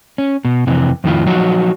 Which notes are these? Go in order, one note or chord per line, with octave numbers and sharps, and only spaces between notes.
C#4
B2
F2 C3 E3
F2 A2 D#3 C4 E4 F4
F3 F#3 D#4 F4 F#4